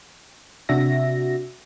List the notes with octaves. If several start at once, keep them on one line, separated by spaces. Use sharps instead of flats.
C3 D4 F#4 E5 A#6